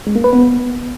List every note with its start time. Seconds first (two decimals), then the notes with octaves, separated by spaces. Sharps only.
0.07 G#3
0.15 A#3
0.24 B4
0.33 B3